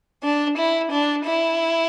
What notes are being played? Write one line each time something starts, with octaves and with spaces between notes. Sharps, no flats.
D4
E4
D4
E4